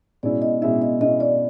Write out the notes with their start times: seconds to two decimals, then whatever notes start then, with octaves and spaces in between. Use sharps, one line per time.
0.23 B2 G#3 C#4 E4 D5
0.42 D#5
0.62 B2 G#3 C#4 E4 E5
0.82 D#5
1.01 B2 G#3 C#4 E4 D#5
1.20 D5